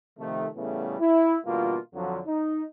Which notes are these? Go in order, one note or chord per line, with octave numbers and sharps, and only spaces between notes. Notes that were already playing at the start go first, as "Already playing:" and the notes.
C3 D#3 F3 A3
A2 C#3 E3 G3 A3 B3
E4
B2 D3 E3 G3 A#3 F4
F2 D3 F3 F#3
D#4